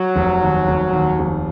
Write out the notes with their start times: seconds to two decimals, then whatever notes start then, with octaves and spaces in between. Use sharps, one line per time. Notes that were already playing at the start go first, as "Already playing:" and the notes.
Already playing: F#3
0.16 F1
0.42 D#2
0.68 F1
0.93 D#2
1.19 F1